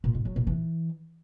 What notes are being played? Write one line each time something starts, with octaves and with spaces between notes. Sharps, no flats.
A#2
G#2
F#3
A#2
E3